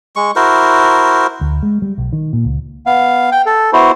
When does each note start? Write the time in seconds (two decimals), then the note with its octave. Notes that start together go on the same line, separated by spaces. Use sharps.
0.16 G#3 C#6
0.36 E4 F#4 A#4 C5
1.41 D2
1.63 G#3
1.82 G3
1.98 B1
2.13 D#3
2.33 A#2
2.45 C#2
2.86 B3 F5
3.32 G5
3.46 A4
3.73 B3 E4 F#4 C5